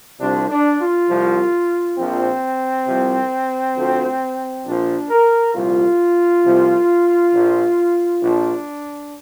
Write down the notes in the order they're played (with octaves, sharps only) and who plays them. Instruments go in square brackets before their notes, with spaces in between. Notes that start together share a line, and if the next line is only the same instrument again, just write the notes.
[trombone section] C2 C3 F3 D4
D4
F4
C2 C3 F3
A#1 A#2 F3 C4
C2 C3 F3
D2 D3 F3
A#1 A#2 F3 D4
A#4
C2 A#2 F3 F4
C2 C3 F3
A#1 A#2 F3
A#1 A#2 F3 D4